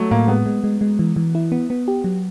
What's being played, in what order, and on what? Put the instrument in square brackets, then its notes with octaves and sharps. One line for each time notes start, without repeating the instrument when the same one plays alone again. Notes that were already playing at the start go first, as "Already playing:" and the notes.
Already playing: [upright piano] F#3 A3
[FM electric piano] A2 [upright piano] A#3
[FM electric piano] G#3 [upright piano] B3
[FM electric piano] G#3
G#3
G#3
E3
E3
E4
B3
B3
G4
F#3